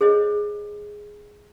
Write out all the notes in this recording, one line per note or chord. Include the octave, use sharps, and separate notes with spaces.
G#4 C5 C#5 D#5